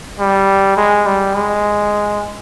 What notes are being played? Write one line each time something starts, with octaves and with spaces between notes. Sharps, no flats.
G3
G#3
G3
G#3